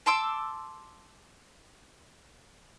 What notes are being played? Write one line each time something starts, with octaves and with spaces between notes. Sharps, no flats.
A5 C6 D6 E6